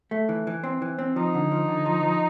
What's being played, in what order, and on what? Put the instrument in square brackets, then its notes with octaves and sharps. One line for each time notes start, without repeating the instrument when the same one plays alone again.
[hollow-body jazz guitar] A3
E3
E3
C4
E3
C4
[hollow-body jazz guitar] F3 [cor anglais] D#4
[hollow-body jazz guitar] D3
F3
D3
F3
F3